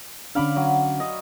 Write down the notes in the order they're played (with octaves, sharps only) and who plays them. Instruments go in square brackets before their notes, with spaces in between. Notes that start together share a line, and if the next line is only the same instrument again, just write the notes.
[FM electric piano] D3 C#4 D4 [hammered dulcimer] F5 B5 D6
[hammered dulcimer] F#3
D#5